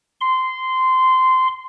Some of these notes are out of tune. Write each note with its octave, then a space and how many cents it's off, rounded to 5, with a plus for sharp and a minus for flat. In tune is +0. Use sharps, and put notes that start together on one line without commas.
C6 -15